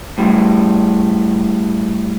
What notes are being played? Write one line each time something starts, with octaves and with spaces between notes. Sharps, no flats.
A2 G3